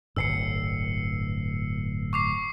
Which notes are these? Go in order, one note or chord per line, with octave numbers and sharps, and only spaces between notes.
D1 G1 G2 E6 C7 C#7
C#6 D6 C7